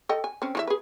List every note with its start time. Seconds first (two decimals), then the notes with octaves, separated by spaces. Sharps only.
0.09 A4 D#5 G5
0.24 G#5
0.42 C4 C#4
0.55 E3 F4 E5
0.67 G#4 B4